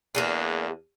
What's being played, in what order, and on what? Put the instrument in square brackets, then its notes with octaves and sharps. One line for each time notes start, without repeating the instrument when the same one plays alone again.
[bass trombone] E2 [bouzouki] A#3 D4 G#4